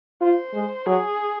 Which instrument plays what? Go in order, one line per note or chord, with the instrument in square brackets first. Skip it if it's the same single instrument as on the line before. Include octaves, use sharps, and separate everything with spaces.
[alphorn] F4 [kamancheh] C5
[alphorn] G#3
[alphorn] F#3 [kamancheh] G#4